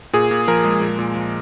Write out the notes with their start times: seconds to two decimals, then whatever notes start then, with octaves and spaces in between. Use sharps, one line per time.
0.13 A#2 G#4
0.31 A#2
0.48 F3 A#4
0.65 G#3
0.81 A#2
0.99 A#2
1.16 F3